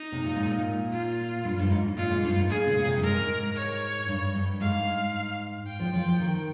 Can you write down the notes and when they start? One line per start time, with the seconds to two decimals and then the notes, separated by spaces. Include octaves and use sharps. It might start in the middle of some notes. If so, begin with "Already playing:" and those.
Already playing: D#4
0.12 C3
0.23 A#2
0.35 G#2
0.46 A#2
0.92 F4
1.44 G2
1.58 G2
1.70 G#2
1.97 A#2 F4
2.10 G#2
2.23 G2
2.37 G#2
2.49 A#2 G#4
2.67 C#3
2.78 C#3
2.85 C3
2.97 G2
3.02 G#2 A#4
3.55 C#5
4.08 G2
4.35 G2
4.61 G#2 F5
5.67 G5
5.80 F3
5.94 F3
6.07 F3
6.20 D#3